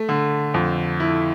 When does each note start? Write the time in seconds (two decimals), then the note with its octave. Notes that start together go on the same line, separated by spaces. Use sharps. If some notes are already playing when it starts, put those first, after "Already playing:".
Already playing: A3
0.09 D3
0.54 F2
1.00 E4